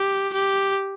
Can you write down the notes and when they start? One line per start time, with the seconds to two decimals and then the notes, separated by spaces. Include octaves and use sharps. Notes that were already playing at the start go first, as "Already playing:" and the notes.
Already playing: G4
0.33 G4